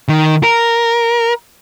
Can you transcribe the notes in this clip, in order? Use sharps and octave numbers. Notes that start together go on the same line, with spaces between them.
D#3
A#4